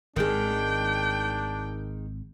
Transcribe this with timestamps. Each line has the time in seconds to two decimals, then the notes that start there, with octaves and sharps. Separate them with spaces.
0.16 G#1 D#3 G#3 D4 G5